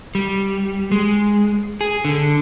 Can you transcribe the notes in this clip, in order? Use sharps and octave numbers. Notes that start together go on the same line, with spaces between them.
G3
G#3
G#4
D3